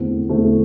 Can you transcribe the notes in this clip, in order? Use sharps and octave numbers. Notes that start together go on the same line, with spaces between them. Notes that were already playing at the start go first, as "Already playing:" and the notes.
Already playing: E2 D3 A3 C4
E2 D3 A3 C4